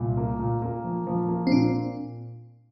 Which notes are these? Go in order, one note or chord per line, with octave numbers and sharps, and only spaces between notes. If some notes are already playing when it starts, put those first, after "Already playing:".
Already playing: C2 A#2
A#3
A#2
A#3
F3
F3
A#3
C4
A#2 D4